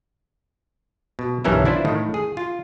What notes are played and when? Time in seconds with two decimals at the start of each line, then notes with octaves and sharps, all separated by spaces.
1.19 B2
1.44 B1 G2 E3 C#4 A#4 E5
1.65 D4 E4 F4 C5
1.85 A2 D#3
2.14 G#4
2.37 F4